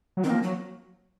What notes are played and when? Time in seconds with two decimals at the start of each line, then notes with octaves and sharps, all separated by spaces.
0.17 F#3
0.24 D#3 C4
0.30 F3 A#3
0.43 F#3